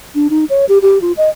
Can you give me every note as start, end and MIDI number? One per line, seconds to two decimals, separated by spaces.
0.15 0.27 62
0.30 0.45 63
0.50 0.65 73
0.69 0.78 67
0.82 1.01 67
1.02 1.12 65
1.17 1.29 75